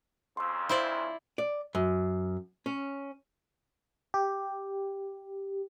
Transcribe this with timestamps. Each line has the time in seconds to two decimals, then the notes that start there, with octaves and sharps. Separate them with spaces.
0.37 F2 C#3 C6 E6
0.69 E4 C5 D5 C6
1.38 D5
1.75 F#2
2.66 C#4
4.14 G4